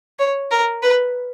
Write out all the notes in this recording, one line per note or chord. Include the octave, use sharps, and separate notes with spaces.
C#5
A#4
B4